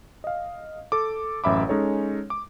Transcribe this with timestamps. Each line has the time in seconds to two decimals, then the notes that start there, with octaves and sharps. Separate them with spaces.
0.24 D#5 F5
0.92 A4 D6
1.44 A1 F#2 E5 B5 D6
1.69 G#3 C#4 D#4 A4 C#5
2.30 D6